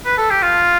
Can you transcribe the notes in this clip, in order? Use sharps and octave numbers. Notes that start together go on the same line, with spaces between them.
B4
A4
G4
F4